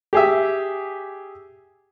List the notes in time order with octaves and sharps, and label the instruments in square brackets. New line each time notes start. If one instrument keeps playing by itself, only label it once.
[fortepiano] G4 G#4 E5